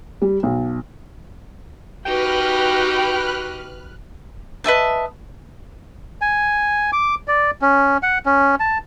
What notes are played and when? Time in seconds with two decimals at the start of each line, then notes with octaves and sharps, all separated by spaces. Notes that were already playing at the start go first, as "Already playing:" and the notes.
0.22 G3
0.43 B1
2.06 D#4 F#4 G4 B4 G5 F6 F#6
4.64 B4 D#5 E5 A5
6.21 G#5
6.93 D6
7.28 D5
7.62 C#4
8.03 F#5
8.26 C#4
8.60 A5